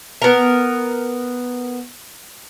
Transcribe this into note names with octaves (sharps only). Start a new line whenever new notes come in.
B3 A#4